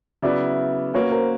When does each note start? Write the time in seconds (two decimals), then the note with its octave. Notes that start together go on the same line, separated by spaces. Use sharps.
0.22 C#3 F#3 B3 E4 D5 E5
0.94 A#3 C#4 F#4 B4 C#5
1.12 A#4 C5